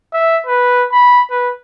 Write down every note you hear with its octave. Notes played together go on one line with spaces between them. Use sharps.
E5
B4
B5
B4